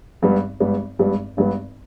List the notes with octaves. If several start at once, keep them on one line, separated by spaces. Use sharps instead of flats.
G#1 G2 G3 B3
G#1 G2 G3 B3
G#1 G2 G3 B3
G#1 G2 G3 B3